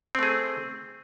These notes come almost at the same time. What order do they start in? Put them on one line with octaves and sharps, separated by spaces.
C4 A3 G#4